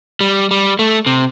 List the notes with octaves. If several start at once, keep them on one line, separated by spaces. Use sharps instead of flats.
G3
G3
A3
C3